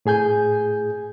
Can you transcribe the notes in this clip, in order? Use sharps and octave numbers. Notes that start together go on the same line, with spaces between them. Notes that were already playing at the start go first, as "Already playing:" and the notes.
A2 G#4 G#5 G6